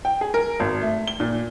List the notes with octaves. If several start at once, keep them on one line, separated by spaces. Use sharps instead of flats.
G5
G#4
A#4
G#1
A3
G7
A#2